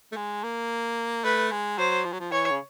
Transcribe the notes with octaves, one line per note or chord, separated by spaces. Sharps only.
A3
G#3
A#3
A3 B4
G#3
F#3 C5
F3
F#3
F3
E3 C#5
C#3